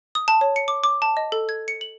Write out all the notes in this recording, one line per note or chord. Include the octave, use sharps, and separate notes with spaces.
D#6
A5
C#5
C#7
D6
D6
A5
D#5
A4
G#6
C#7
F#7